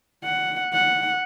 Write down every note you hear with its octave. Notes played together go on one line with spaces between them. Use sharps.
F#5
F#5